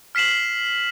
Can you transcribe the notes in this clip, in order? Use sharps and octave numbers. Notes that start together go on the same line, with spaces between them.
F6 B6 C7 E7 F#7